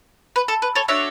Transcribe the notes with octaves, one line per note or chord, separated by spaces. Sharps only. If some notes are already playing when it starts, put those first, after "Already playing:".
B4
A4
B4
A4 C#5
D4 F#4 A4 C#5 E5